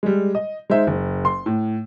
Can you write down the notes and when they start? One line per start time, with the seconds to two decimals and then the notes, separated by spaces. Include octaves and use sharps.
0.03 G3 G#3
0.35 D#5
0.70 G#3 D#4 C5 E5
0.87 F#1
1.25 C6
1.46 A2